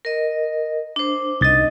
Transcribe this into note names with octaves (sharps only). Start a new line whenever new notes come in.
A#4 D#5
D4 C5
C2 D#4 D#5 A6